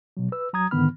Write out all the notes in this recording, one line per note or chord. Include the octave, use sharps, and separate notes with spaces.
B2 F#3
B4 E6
F#3 A#5 D#6 G#6
G#2 D3 D#3 B3 B5 F6